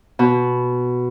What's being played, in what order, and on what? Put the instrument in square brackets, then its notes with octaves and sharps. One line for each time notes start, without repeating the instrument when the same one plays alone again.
[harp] B2